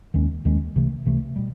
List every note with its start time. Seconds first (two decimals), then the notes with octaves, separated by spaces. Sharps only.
0.14 D#2 D#3 G#3 C#4
0.45 D#2 D#3 G#3 C#4
0.75 C2 C3 E3 A3
1.05 C2 C3 E3 A3
1.36 B2 G3